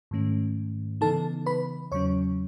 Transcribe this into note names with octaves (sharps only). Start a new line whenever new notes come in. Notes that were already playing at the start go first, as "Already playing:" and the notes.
G#2 D#3 A3 C#4
C#3 E3 B3 D#4 A4 A5
B4 B5
E2 C#3 F#3 C#4 C#5 C#6